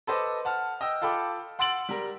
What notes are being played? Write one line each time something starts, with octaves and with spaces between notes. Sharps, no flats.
A4 B4 C5 D#5 D6
F#5 A5 F6
D#5 G5 E6
F4 A4 G5 B5 D6
F#5 C6 E6 A6 D7 F#7
G3 A#4